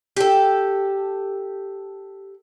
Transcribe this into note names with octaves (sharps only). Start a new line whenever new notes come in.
G4 A4